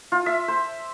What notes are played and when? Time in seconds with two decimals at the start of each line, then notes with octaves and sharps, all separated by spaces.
0.12 F4
0.26 E5
0.48 C5